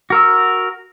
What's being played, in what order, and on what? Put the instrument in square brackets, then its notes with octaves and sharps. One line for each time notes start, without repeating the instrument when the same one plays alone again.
[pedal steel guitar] F#4 A#4 E6